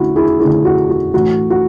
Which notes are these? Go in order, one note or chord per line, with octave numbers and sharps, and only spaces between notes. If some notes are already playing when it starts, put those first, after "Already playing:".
Already playing: D3 A3 C#4 E4 F#4
E4 G#4
D3 A3 C#4 E4 G#4
F#4
F#4
A2 E3 A3 F#4
F#4